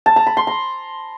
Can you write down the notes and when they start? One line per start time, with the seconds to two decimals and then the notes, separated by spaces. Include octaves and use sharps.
0.06 A5
0.16 A#5
0.27 B5
0.37 C6
0.47 A#5